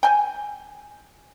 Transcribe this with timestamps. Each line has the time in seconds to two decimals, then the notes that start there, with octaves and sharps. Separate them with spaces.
0.03 G5 G#5